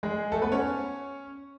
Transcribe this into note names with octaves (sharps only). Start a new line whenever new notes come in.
G#3 G#4
A3 A4
B3 B4
C#4 C#5